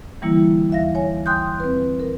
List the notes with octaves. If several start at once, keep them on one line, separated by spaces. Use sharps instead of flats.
D3 E3 G3 A#3 E4
D#2 E5 F5 A#6
C#5 G#5
G5 G#5 C6 D#6 F#6 G6
C4 B4
A#4